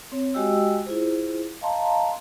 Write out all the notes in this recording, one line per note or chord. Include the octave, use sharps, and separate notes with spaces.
C4 C#5
G#3 F#4 G4 D#5 G5 E6
E4 F4 G#4 C5
D#5 F5 A5 A#5 C6